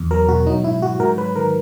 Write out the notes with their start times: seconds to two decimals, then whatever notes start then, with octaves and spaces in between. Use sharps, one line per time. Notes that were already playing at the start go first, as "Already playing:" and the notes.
Already playing: E2
0.11 F#3 A#4
0.28 B2 F#4
0.46 F#3 D#4
0.64 G#2 E4
0.82 F#3 F#4
1.00 G#2 A#4
1.18 F#3 B4
1.36 D#3 A#4